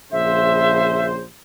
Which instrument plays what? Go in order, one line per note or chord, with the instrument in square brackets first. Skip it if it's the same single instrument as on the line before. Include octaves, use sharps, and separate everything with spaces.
[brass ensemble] A#1 C#3 C5 [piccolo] E5